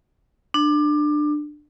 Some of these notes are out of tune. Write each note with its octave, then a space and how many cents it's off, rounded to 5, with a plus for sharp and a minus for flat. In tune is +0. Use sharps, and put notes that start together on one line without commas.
D4 +25